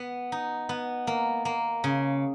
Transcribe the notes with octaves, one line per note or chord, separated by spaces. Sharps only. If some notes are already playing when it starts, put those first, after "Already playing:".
Already playing: B3
D#4
B3
A#3
A#3
C#3